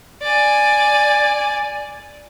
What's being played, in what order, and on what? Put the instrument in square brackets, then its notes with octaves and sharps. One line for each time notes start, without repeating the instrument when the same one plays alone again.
[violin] D5 G#5